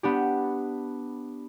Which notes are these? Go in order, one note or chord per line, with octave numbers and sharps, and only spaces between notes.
B3 D4 G4